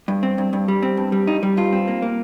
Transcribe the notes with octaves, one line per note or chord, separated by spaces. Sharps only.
G2
C4
G2
G2
G3
C4
G2
G3
G2 D#4
G3
G2 F4
C4
A#3
A#3